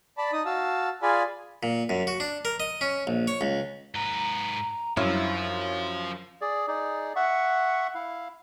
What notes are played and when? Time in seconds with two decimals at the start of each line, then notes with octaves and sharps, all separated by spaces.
0.18 D5 A5 B5
0.33 D#4 D#6
0.46 F#4 F5 A5 E6
1.03 F4 G#4 D5 F5 G#5 B5
1.63 A#2
1.89 F#2
2.07 F#4
2.20 D4
2.45 A#4
2.60 D#5
2.81 C#4
3.07 A#1
3.27 C#5
3.41 C#2
3.95 G#2 B4 A#5
4.97 F#2 F3 E4 C#5 F5 F6
6.41 G#4 D5
6.68 D#4 G#4 D5
7.16 E5 F#5 C#6
7.95 E4 F5